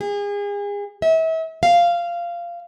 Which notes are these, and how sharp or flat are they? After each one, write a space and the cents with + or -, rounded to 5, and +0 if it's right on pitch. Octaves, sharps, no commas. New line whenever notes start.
G#4 -35
E5 -35
F5 -15